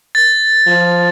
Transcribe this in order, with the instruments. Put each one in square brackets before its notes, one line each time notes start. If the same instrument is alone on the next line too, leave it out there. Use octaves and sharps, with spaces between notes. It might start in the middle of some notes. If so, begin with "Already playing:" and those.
[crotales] A6
[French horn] F3